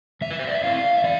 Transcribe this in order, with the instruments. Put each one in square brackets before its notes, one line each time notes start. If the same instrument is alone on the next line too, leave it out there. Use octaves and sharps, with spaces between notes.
[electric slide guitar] E3 E5
B4
C5
D5
E5
A3 C4 E4 F5
E5
E3 D5